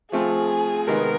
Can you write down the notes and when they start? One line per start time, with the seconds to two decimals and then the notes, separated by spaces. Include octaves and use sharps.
0.12 F3 A3 C4 F4 G#4
0.87 C3 D#3 G#3 B3 D#4 A#4